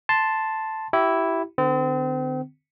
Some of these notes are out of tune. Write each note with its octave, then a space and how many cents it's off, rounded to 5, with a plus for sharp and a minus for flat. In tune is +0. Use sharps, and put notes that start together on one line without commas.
A5 +0 C6 +0
E4 +0 G4 -30
D3 +30 C4 -35